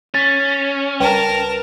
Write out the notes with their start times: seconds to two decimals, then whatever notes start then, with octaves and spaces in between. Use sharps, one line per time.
0.14 C#4 A6 B6
1.00 C#2 G3 A#4 B4 G5 A5